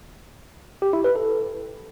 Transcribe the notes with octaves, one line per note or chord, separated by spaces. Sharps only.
G4
E4
B4
A4